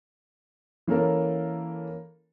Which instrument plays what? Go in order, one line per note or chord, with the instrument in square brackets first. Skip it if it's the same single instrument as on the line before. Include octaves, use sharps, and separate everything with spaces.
[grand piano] E3 A#3 C#4 A4 A#4